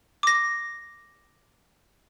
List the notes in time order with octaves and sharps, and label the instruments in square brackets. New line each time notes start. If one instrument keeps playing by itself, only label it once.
[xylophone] D6 A#6